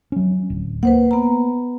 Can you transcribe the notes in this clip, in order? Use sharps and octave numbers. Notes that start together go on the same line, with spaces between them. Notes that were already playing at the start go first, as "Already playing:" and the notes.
F#3 C#4
D1
A#3 B4 C5 F#5
B3 A#5